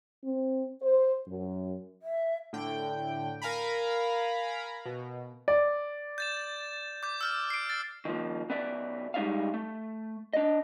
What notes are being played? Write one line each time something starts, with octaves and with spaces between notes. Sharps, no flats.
C4
C5
F#2
E5
A2 D3 G5
A#4 F5 G#5 A#5 B5
B2
D5
G6 A6 E7
D6 G6
E6 F6 G6
C7 D7
A6
D#3 F3 A#3
B1 B3 D5 E5
G3 G#3 D#4 D5 E5 F5
A3
D4 D#5